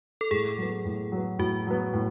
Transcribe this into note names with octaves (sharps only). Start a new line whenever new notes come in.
A4
A2 G#4
F#3 B3
A2
F#3 B3
A2 F#4
F#3 B3
A2